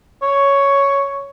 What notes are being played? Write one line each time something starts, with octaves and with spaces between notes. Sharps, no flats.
C#5